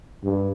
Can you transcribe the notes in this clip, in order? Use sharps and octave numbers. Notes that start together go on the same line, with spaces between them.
G2